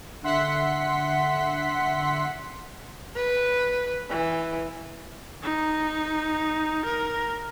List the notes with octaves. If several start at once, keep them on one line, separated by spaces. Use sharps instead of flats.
D3 E5 F#5 C6 B6 C#7
B4
E3
D#4
A#4